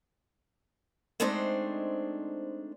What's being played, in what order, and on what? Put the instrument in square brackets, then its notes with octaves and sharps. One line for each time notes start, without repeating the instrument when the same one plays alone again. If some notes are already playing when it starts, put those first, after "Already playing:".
[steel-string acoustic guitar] G#3 A3 C4 D4 D#4 C5